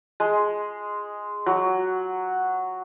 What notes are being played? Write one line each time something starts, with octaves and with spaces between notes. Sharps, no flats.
G#3
F#3